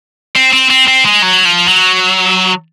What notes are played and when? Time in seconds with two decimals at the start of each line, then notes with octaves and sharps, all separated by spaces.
0.36 C4
0.53 C4
0.70 C4
0.87 C4
1.05 G#3
1.22 F#3
1.45 F3
1.68 F#3